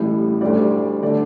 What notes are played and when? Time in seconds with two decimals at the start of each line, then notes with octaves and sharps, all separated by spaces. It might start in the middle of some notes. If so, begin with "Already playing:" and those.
Already playing: A1 A2 G3
0.41 D2 D3 G3 D5
1.02 D3 A3 D5